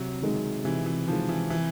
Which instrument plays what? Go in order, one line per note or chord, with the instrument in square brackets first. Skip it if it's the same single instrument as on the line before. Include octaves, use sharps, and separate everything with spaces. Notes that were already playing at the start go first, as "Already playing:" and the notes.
Already playing: [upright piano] C3 [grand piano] F#3
[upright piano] D#3 G#3
[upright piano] C3 [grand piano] E3
[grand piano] E3
[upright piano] D#3 G#3 [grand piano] F3
[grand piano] E3
[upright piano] C3 [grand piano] E3